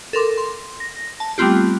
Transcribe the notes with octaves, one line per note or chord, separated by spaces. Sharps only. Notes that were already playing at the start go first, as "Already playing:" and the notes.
A4 A#4 C6 D6
C6
A#6
A5
G3 A3 B3 C4 F4 G4